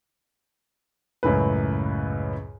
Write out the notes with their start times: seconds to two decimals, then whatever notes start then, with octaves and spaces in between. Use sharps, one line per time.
1.23 C#2 F#2 A2 B4